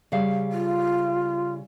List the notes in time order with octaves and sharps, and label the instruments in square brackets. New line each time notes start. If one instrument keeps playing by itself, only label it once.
[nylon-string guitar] C#3 G3 F5
[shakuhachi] F4